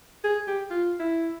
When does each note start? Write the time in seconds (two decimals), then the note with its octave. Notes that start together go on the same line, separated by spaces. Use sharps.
0.24 G#4
0.47 G4
0.70 F4
0.99 E4